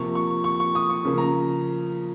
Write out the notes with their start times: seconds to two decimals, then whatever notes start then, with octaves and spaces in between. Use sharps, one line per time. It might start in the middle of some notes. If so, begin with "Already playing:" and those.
Already playing: C3 F3 A#3 C#6
0.15 C#6
0.44 C#6
0.60 C#6
0.75 D#6
0.89 C#6
1.05 C#3 F3 A#3
1.18 A#5